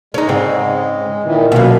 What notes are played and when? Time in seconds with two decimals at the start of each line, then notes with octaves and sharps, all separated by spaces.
0.14 G#3 C#4 D#4
0.29 G#2 C#3 C4
1.24 A#2 D#3 E3
1.52 F#2 B2 A#3